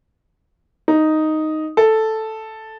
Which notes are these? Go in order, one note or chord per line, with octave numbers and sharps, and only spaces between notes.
D#4
A4